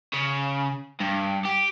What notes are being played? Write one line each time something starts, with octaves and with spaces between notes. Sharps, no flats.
C#3
G2
G4